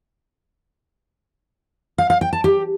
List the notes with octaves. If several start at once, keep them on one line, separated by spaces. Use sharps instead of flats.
F5
F5
G5
A5
G4